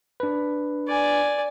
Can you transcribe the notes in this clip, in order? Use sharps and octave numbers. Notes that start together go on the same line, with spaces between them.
D4 B4
D5 G#5